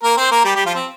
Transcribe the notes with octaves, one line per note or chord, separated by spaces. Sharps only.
A#3 A#4
C4 C5
A#3 A#4
G3 G4
G3 G4
F3 F4
C4